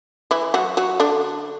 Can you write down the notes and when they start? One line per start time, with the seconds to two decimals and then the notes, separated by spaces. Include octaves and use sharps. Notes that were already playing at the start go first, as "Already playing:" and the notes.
0.31 E3 E4
0.54 F#3 F#4
0.77 F#3 F#4
1.00 D3 D4